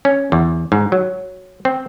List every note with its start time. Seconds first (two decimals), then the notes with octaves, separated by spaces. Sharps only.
0.05 C#4
0.32 E2
0.72 G#2
0.92 F#3
1.65 C4